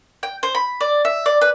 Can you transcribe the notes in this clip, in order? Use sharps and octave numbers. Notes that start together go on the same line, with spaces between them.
G5
C5
B5
D5
E5
D5
B4